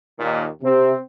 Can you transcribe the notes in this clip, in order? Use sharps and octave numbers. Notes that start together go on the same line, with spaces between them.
D#2 A#2 D#3
C3 C4